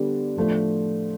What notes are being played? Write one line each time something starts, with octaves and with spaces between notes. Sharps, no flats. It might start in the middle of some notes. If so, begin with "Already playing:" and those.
Already playing: D3 G3 B3 D4 G4
A2 F3 A3 D4